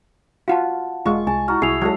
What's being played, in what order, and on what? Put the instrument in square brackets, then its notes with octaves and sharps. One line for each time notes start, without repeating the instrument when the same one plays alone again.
[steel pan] F4 F#4 [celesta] F5 F#5 A5
[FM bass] E1 [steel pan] G#3 F4 [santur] C#6
[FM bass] C2 [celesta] G#5 [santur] A5
[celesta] E4 A#5 F6 [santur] F#4
[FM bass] C2 [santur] E4 [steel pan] G#4 [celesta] C7 F7
[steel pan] F#3 G#3 A4